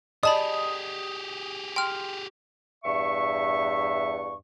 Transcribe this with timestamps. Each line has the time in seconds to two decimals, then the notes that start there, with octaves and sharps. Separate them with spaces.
0.23 G4 G#4 D5 D#5 A5 B5 D#6
1.76 G5 C6 F6
2.85 E2 G2 E5 C#6